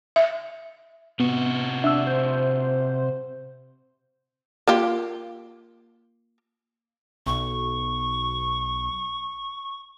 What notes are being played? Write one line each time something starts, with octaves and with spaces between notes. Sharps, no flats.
E5
C3 B3 F#4
D4 E5 E6
C5
A#3 F4 G4
B1 B2 C#6